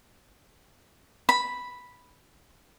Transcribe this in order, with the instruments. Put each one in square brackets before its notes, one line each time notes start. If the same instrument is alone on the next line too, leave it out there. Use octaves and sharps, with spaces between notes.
[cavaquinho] B5